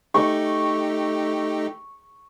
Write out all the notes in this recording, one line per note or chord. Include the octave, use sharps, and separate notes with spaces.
A3 D#4 G4 C#6